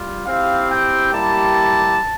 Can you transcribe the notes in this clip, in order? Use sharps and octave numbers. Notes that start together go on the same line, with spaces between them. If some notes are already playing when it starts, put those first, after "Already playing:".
Already playing: G3 F4
C4 E4 G4 F5
G5
G3 A#3 E4 G4 A5